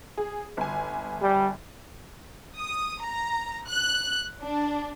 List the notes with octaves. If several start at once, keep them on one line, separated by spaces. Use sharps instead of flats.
G#4
G1 G#5
G3
D#6
A#5
F#6
D4